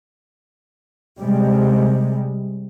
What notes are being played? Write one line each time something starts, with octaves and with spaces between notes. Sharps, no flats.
C3 G3 G#3